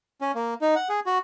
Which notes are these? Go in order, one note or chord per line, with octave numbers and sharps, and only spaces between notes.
C#4
A#3
D#4
F#5
G#4
F#4